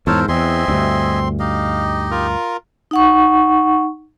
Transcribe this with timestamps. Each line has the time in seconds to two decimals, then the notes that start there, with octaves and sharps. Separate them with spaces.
0.07 E2 G#2 A4 A#4 C5 C#5 A5
0.28 E2 C4 D#5 E5 G#5 C6
0.68 D2 G2
1.39 D#4 G4 D#5 F5
2.11 F4 A#4
2.91 D#4 F#5 C#6